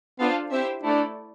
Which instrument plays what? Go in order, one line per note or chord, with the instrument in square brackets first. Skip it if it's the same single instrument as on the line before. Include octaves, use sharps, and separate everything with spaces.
[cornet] B3 [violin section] D4 F4 A4 C5 F5
[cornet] C4 [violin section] E4 G4 C5 E5
[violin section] A3 E4 A4 D5 [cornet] D4